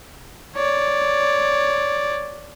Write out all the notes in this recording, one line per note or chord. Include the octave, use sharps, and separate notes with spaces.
C#5 D5